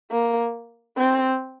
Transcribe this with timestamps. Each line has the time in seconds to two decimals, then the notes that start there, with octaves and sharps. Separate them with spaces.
0.11 A#3
0.98 C4